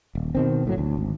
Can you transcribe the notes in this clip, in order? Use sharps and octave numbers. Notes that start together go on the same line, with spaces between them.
D#1
B2 D#3 C4
G1 A2 F#3
D2
G#1